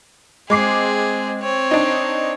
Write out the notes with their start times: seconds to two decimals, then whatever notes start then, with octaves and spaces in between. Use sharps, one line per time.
0.50 G#3 C4 G#4 D6 C7
1.41 C4 C#5
1.71 D4 D#4